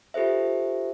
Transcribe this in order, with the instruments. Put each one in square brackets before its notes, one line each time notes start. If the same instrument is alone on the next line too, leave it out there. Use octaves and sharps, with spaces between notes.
[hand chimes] F4 G4 A4 C5 E5